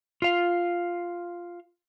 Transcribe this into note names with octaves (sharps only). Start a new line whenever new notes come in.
F4 F5